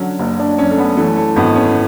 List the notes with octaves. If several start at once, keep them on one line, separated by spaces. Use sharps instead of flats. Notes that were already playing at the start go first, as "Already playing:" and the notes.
Already playing: D3 F#3 C#4
F#1
D4
F#2 C#4
A3
B3
E3 A3
A3
G#1 B3
C#4